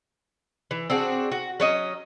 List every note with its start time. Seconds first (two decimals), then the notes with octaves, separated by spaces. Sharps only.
0.71 E3
0.90 C4 D4 F#4 G#4
1.32 F#4
1.60 F#3 C#4 D#5